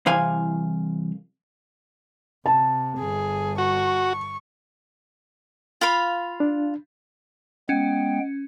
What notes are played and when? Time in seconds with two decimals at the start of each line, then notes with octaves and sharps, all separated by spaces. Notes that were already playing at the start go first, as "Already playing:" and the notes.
0.06 C2 E3 C5 F5 G#5
2.46 C3 A5
2.99 G1 G#4
3.58 F#4 C#6
5.81 F4 F5 B5
6.40 D4
7.69 G#3 B3 C#4 G5